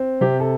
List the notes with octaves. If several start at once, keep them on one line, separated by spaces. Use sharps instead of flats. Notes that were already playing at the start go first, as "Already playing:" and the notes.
Already playing: C4
C3 G4
A4